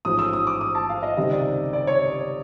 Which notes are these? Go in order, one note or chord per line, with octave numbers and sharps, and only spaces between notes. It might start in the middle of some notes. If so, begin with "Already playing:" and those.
A1 G#2 F3 D#6
E6
D#6
D6
D#6
A5
F5
D#5
C#2 C3 D#3 G3 D#5
D5
D5
C#5